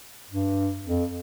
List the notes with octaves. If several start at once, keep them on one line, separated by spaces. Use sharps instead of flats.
G2
F2